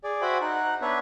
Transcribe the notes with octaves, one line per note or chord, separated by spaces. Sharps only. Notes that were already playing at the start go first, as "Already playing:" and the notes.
G#4 D5
F#4 C5 E5 G5 G#5 B5
D#4 F#5
B3 D4 B4 C#5 E5